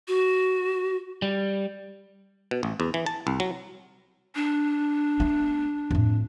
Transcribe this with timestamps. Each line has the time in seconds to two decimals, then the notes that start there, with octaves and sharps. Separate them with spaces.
0.08 F#4
1.22 G3
2.51 B2
2.63 A1
2.80 E2
2.94 E3
3.06 A5
3.27 C2
3.40 F#3
4.35 D4
5.20 A3 B3
5.91 F2 A2